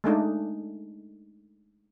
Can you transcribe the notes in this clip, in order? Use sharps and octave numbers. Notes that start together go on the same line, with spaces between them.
G#3 A3 D4 D#4